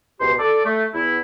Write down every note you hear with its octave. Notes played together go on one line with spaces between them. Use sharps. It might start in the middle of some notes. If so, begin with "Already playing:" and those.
C#2 B2 G4 C5 C6
A4 D5
A3
E2 E4